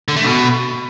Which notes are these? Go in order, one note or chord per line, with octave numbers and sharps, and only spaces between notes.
D3
A3
B2